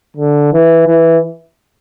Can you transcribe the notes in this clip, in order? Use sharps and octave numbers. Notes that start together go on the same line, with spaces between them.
D3
E3
E3